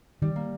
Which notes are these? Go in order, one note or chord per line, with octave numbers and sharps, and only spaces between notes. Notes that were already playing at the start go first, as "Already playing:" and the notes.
D#3 G3
A#3